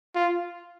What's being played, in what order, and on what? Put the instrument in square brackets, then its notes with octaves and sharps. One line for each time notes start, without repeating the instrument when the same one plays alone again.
[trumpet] F4